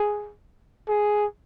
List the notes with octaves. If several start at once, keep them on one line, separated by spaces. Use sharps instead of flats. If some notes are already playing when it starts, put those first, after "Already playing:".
Already playing: G#4
G#4